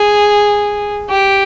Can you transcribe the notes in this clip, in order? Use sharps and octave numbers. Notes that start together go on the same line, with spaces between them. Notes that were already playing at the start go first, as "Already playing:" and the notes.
Already playing: G#4
G4